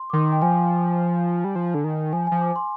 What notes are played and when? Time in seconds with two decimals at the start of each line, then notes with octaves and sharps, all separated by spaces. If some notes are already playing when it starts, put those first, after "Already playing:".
Already playing: C6
0.10 D6
0.13 D#3 C6
0.32 G5
0.42 F3 G#5
1.44 G3
1.55 F3
1.74 D3
1.84 D#3
2.13 F3 G#5
2.27 F3 G#5
2.41 D6
2.56 C6